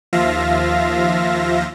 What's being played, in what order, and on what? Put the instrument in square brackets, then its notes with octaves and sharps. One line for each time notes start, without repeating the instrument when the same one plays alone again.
[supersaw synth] D#2 F3 F4 E5 F5 A#6